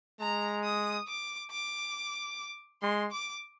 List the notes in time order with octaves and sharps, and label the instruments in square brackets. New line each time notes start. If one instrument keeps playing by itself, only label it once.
[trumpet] G#3 [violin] A#5
[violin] D#6
D6
D6
[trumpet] G#3 [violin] C6
[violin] D6